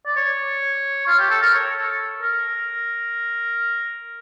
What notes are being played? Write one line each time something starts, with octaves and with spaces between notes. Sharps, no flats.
D5
C#5
F4
G4
A4
A#4
C#5
A4
A#4